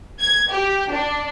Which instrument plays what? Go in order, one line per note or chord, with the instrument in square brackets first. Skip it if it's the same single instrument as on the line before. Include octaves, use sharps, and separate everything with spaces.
[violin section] G#6
G4
D4